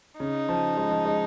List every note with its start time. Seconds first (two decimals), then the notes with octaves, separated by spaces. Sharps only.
0.20 C#3 D#4
0.49 F3
0.77 G#3
0.91 F3
1.05 G#3